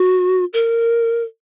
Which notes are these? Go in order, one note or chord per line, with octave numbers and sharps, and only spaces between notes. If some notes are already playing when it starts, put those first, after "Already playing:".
Already playing: F#4
A#4